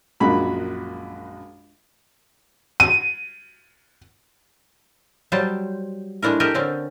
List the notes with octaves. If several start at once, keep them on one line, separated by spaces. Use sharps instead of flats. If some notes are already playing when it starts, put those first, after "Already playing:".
A#1 F#2 G#3 F#4 B5
D#7
F#3 G3 C5 A5
G#3 A3 D4 E4 A#4
G4 A4 A#4 D#5 G5
D3 C4 C#4